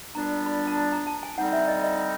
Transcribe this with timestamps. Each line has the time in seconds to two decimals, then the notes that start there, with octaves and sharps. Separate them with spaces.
0.15 A#2 G3 B3 D4 A#5
0.46 B5
0.67 A5
0.76 A#5
0.92 A#5
1.07 A5
1.23 G#5
1.38 D3 G3 C4 D#4 F#5
1.53 E5
1.68 D#5
1.84 D#5